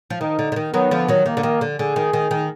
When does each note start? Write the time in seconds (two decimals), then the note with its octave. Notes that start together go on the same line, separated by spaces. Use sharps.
0.10 F3
0.21 D#3 D#4
0.39 D3
0.52 D3
0.56 D#3
0.73 D#3 F#3 B3
0.91 D3 F3
1.08 D#3 F#3
1.26 D#3 A#3
1.37 D3
1.43 D#3
1.61 D3
1.79 D3 G#4
1.96 D#3
2.13 D#3
2.31 D#3